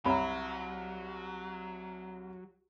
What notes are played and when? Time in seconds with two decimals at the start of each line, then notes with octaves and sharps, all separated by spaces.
0.05 C2 F#3 C#5 E5 A#5 B5